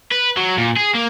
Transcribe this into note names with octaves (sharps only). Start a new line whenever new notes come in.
B4
F#3
A#2
G#4
A#3